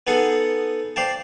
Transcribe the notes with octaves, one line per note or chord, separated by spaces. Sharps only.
B3 D#4 G#4 A4 F#5
C5 D5 F5 G5 A5